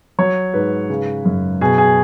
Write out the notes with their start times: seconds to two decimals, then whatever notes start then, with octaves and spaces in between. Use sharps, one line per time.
0.19 F#3 C#5
0.54 G#2 B4
0.90 C#3
1.25 F#2
1.61 B2 G#4
1.78 G#4